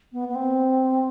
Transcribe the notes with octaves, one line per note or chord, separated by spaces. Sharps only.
B3
B3
C4